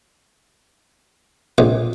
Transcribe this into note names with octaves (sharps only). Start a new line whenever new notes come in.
A#1